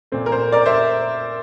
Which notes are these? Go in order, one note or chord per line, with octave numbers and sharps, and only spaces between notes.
A#2 A3 C4
A#4
C5
A#4 D5
C5 E5